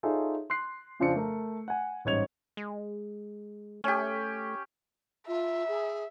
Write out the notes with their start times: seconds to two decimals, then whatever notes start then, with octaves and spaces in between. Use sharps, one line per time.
0.03 D#4 F4 G#4 A4 C#5 E5
0.50 C6 F#6 C7
1.00 F2 C#3 F3 C4 D4 C#7
1.15 A3 A#4
1.68 F#5 G#5
2.05 A1 G#2 G3 C#5 G#6 F7
2.57 G#3
3.84 A3 C#4 G4
5.27 F4 E5
5.68 G#4